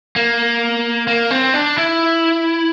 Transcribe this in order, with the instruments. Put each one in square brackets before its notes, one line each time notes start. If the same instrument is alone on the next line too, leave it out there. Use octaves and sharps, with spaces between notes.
[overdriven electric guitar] A#3
A#3
C4
D4
E4